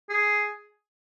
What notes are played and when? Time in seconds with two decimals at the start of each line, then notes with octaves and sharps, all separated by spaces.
0.09 G#4